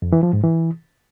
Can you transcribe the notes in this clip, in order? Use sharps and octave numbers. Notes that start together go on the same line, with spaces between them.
F2
E3
F3
G#2
E3